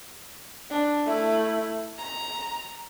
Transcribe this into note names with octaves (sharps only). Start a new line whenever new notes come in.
D4
A3 E4
A#5